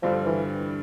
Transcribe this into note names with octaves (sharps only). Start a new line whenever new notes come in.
G2 D3 F3 G3
E3